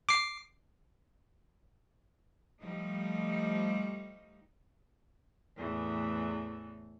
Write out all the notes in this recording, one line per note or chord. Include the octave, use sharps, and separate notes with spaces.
D6 C7
F3 G3 A3 D#4
E2 A2 E3 A3